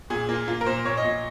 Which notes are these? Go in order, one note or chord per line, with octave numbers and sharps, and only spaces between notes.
A#2 G#4
A#3 F4
A#3 F4
A#4
A#2 C5
A#2 C#5
D#5
A#2